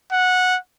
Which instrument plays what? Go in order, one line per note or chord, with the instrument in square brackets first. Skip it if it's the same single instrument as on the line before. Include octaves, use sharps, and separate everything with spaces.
[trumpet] F#5